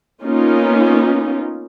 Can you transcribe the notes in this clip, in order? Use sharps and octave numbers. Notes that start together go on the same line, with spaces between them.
A#3 B3 C#4 D#4 F4